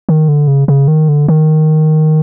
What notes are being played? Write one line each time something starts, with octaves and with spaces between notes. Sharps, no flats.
D#3
D3
C#3
C#3
D#3
D3
D#3